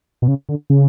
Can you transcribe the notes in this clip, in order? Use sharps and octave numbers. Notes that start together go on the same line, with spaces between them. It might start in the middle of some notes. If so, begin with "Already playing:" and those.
B2
C#3
D3
C#3